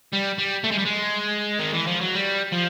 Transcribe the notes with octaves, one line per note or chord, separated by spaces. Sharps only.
G3
G3
A3
G#3
G3
G#3
D#3
E3
F3
F#3
G3
F3